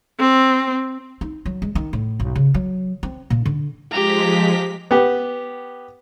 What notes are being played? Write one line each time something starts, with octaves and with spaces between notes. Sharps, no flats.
C4
D#4
F#3
G#3
D#3
A2
B1
C#3
F#3
C4
A#2
D3
F3 G#3 G4 A#5 B6
B3 G4